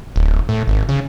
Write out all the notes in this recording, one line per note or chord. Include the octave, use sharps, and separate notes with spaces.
D1
A2
G#1
C#3